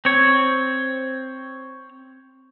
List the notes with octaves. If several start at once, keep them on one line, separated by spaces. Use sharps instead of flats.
C4 C#5